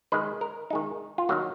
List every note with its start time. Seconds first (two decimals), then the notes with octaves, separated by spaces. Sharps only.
0.12 D#3 G#3 D#4 B4
0.41 A#4
0.70 D#3 G#3 D#4
1.18 F4
1.29 D#3 F#3 A#3 F#4